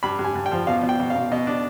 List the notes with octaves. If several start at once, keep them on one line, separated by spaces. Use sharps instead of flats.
G2 B5
G2
G#5
G2
G5
F3
B2 F5
B2
G5
B2
F5
B2
B2 D#5
D4